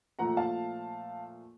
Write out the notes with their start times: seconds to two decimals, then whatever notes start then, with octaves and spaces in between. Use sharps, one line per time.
0.19 A#2 F3 A3 F#5 A#5
0.37 F5 A5